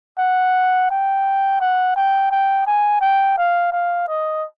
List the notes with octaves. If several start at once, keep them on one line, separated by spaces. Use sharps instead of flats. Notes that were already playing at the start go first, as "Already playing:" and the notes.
F#5
G5
F#5
G5
G5
G#5
G5
F5
F5
D#5